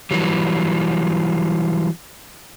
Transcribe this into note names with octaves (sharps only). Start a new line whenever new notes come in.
E3 F#3 G3